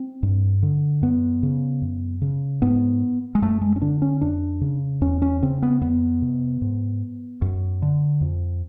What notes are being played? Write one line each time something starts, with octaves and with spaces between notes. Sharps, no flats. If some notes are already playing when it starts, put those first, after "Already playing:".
Already playing: C4
G2
D3
F#2 B3
C#3
F#2
C#3
G#2 B3
G#3
F#2 A3
G#3
C#4
D3 D4
C#4
F2 D4
C#3
E2 C#4
C#4
C#3 C4
B3
F2 B3
C3
G#2
F#2
D3
F2